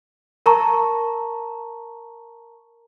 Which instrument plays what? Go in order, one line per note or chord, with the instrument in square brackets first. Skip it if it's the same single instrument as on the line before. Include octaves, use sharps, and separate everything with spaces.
[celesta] A#4 A5 A#5 C#6